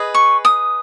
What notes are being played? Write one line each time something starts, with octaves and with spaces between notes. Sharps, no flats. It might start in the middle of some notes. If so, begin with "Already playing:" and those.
Already playing: G#4 B4 D#5
C#6
D#6